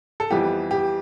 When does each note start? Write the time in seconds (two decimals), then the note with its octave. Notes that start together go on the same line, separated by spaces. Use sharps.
0.20 A4
0.31 F2 E3 G3 B3 G4
0.71 G4